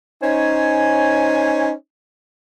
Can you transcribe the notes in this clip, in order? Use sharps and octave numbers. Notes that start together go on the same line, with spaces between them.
C#4 D#4 C5 C#5 G#5